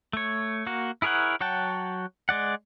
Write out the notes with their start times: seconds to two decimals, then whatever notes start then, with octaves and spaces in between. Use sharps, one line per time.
0.13 A3 C#5
0.67 A#3 F#4
1.02 E4 G#4 A#4 C#5 F#5
1.41 F#3 C#5 F#5 G5 A5
2.29 G#3 D5 F#5